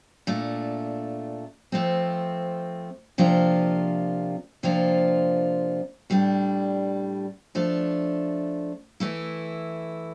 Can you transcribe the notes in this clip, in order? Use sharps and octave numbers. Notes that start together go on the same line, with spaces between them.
A#2 A3 D4
F3 A3 C4
C3 F3 A#3 D4 F4
C3 F3 A#3 D4 F4
A2 G3 D4
F3 A3 D4
E3 A3 E4